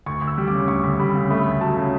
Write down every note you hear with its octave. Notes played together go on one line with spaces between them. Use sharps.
D2 C#6
D2
E6
G3
D6
C#3
D2 C#6
D2
G3 B5
C#3
A3 B5
D2
F#3 A5
C#3